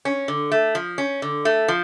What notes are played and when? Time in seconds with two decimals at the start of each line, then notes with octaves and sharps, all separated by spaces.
0.05 C#4
0.28 D3
0.52 A3
0.75 F3
0.98 C#4
1.22 D3
1.45 A3
1.68 F3